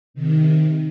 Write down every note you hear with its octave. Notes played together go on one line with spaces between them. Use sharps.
C3 D#3